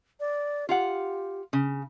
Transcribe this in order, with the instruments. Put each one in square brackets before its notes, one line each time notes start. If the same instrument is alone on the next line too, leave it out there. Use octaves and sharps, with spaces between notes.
[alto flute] D5
[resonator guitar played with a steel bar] F4 F5 F#5 [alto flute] G4
[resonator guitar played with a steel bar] C#3